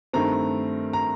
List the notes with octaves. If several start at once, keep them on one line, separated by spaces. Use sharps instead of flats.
G2 D#3 A3 C4 A#5
A#5